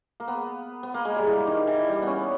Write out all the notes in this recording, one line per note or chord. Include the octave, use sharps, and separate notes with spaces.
A#3
B3
B3
A#3
G#3
G3
E3
D#3
E3
G3
B3 C#4